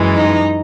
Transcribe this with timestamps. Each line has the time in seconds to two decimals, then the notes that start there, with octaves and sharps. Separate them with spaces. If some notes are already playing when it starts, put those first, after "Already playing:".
Already playing: F#2 E3 G#3
0.16 D#4